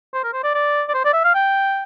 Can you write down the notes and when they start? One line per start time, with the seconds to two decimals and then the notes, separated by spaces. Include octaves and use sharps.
0.14 C5
0.24 A#4
0.34 C5
0.44 D5
0.55 D5
0.89 D5
0.94 C5
1.05 D5
1.14 E5
1.24 F5
1.35 G5